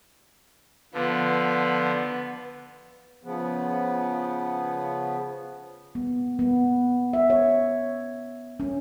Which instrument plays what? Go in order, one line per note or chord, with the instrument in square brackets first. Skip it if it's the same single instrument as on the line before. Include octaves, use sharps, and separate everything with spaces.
[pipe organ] D3 F3 [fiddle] B3
[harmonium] C#3 F3 B3
[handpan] B3
B3
E5
C#5
C#4